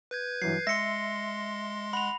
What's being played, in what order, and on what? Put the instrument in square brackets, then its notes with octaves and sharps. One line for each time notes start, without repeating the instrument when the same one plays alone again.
[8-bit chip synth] B4 G6 G#6
[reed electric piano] G2 E3 F#3 [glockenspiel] C7
[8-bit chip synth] G#3 C6 [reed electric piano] E5 [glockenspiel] A#6 C#7
[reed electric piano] F#5 [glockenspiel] B5 F7